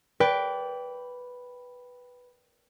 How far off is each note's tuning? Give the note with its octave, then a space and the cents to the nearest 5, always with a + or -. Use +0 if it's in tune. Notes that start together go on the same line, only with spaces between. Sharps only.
B4 +0 D5 -25 G5 +0